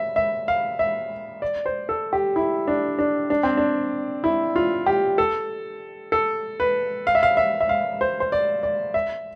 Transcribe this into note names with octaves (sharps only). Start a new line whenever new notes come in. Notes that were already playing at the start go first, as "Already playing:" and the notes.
Already playing: E5
E5
F5
E5
D5
C5
A4
G4
E4
D4
D4
D4
C4
D4
E4
F4
G4
A4
A4
B4
F5
E5
F5
E5
E5
F5
C5
C5
D5
D5
E5